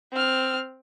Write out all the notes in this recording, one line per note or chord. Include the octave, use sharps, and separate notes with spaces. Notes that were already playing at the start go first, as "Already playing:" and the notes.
C4 F6